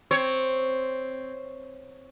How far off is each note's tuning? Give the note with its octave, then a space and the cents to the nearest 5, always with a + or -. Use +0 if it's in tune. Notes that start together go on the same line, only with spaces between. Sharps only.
C4 +0 C#5 +0